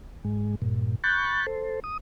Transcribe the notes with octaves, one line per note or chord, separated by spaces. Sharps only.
G#2 G#3
G2 A#2
B5 C#6 F#6 G6 A6
A4 C5
D#6